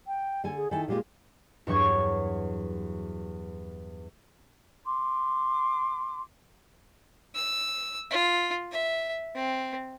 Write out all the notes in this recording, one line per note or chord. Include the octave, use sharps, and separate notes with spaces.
G5
D3 A4 G#5
G#4
D#3 E4 A4 G#5
A#2 G#3 F4 G4
E2 G2 F#3 C#6 G#6
C6 D6
E6
F4
E5
C4